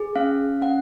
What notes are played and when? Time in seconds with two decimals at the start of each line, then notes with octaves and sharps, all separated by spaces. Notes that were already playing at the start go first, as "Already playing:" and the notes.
Already playing: G#4
0.16 C#4 F5
0.62 C#4 F#5